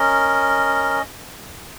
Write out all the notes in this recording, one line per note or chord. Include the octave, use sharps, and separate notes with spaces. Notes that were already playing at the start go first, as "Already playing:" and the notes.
Already playing: C#4 A#4 D#5